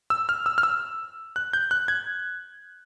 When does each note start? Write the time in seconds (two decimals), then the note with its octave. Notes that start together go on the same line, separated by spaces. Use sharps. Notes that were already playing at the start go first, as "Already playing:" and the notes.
0.10 E6
0.29 F6
0.46 E6
0.58 F6
0.63 E6
1.36 F#6
1.53 G6
1.71 F#6
1.88 G#6